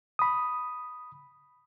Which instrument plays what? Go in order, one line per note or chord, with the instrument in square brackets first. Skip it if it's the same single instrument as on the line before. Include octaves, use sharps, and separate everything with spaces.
[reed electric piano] B5 D#6